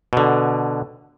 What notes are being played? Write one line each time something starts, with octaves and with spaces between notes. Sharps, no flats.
B2 D3